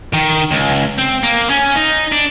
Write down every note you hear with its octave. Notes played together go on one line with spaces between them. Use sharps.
D#3
C#2
C4
A#3
C#4
D#4
D4